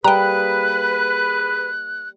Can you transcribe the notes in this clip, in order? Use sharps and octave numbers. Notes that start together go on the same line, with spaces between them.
G3 A#3 G#4 B4 G5 A#5 F#6